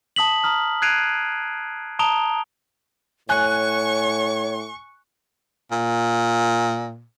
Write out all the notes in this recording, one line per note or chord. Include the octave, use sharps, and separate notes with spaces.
A5 D#6 B6 F#7
A#5 D#6 F6
F#6 G#6 C7 D7 D#7 F7
A5 A#5 D#6 D7 F7 G7
A2 C#5 G#5 C#6 F#6
A#2